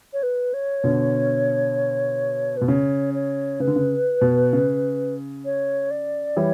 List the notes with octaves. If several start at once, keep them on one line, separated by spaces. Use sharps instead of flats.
C#5
B4
C#5
B2 D3
B2 B4
C#3 C#5
C#5
C#3 B4
D3
C#3
B2
C#3
C#5
D5
E3 G3 C#5